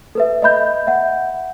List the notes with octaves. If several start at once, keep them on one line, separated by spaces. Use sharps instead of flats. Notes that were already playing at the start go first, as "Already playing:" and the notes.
A4 B4 E5
D#5 E5 B5 G6
E5 F#5